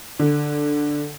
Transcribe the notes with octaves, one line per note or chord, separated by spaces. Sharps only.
D3